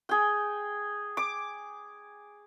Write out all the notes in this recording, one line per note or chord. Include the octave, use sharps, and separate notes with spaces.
G#4 G5
D6